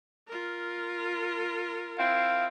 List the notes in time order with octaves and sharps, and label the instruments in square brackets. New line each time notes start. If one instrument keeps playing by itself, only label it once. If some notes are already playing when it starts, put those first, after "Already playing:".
[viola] F4 A#4
[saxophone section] C4 E4 [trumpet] F5